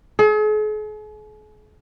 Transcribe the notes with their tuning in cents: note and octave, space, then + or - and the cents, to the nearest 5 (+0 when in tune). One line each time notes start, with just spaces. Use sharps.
G#4 +45